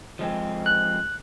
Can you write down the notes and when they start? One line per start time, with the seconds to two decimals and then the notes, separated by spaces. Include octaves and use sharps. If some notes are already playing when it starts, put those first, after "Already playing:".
0.19 F3 G#3 C4
0.66 F#6